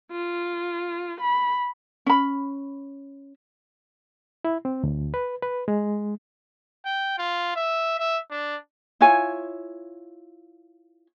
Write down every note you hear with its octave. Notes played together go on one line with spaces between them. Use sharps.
F4
B5
C#4 B5
E4
C4
D2
B4
B4
G#3
G5
F4
E5
E5
D4
E4 F4 C#5 G#5